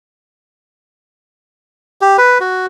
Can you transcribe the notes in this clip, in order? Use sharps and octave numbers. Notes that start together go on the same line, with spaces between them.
G4
B4
F#4